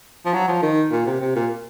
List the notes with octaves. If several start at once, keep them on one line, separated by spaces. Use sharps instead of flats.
F3
F#3
F3
D#3
A#2
C3
C3
A#2